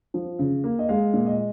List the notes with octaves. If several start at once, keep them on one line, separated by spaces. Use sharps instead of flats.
F3
C#3
A#3
D#5
G#3 F5
A#2
D#5